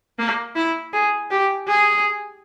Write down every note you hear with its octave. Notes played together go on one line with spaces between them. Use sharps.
A#3
E4
G#4
G4
G#4